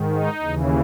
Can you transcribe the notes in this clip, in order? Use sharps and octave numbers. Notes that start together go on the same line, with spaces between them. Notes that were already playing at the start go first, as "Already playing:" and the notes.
Already playing: G#2 D#3
D#4
D#2 C#3 E3